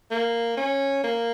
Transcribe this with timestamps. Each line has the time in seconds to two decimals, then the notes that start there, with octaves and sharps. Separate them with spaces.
0.11 A#3
0.57 C#4
1.04 A#3